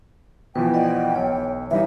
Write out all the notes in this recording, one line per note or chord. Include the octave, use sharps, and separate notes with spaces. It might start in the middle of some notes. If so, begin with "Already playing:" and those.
B2 E3 F3 B4 G5
D5 D#5 F#5
B1 C#5
E3 G3 D#4 E5 F5